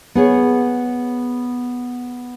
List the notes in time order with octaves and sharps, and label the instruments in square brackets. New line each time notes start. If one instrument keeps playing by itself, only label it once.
[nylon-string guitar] B3 G#4 C#5